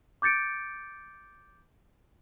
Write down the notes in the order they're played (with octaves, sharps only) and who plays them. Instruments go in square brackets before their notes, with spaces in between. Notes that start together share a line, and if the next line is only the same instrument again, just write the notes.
[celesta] D6 G6 A6 C#7 D7